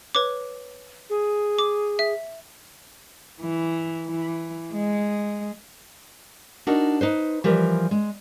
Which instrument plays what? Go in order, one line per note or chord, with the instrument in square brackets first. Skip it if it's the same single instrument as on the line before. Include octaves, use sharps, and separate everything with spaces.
[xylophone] B4 C#5 D6
[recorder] G#4
[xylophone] D6
E5
[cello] E3
E3
G#3
[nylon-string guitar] D4 D#4 F#4 A#4
D#4 B4 C5
E3 F3 G3 A#4
G#3